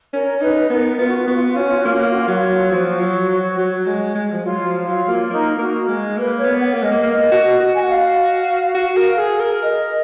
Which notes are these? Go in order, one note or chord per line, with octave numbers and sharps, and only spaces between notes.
C#4 A#4
D#4 B4
B3 A#4
B3 F4
F#4
F4
B3 F#4
F4
F#4
F4
C#4 F#4
F4
F#4
A#3 F4
F#4
F4
F#4
F4
F#3 F#4
F4
F#4
F4
F3 F#4
F#3
F#3
F#3
G#3
G#3
F3
F#3 F4
F3
F#3 F4
A#3
A#3 D#4
A#3 F#4
G#3
A#3 B4
C#5
B3
F#5
A#3
G#3 D#5
A#3
A#3 D#5
F#4
F#4
G#5
F#5
F5
F#4
A#4
G#4
A#4
A#4 D#5